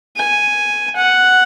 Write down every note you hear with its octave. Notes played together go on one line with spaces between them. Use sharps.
G#5
F#5